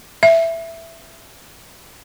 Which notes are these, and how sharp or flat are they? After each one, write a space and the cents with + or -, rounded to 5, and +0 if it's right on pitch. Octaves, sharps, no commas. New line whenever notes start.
E5 +5